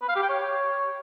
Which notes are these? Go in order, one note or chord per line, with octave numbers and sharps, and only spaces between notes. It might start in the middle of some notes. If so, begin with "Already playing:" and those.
B4
F5
G4
G5
C#5